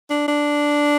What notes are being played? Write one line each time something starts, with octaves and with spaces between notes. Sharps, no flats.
D4
D4